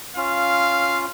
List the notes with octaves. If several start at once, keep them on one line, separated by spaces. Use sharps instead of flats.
C#4 F4 F5